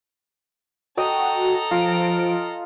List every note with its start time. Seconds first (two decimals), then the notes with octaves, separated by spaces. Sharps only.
0.97 F#4 A4 D#5 G5 A#5
1.71 F3 F4 D7